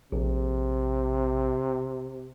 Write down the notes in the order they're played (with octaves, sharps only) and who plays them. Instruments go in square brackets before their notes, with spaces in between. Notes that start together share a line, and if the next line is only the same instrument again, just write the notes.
[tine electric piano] A#1 [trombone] C3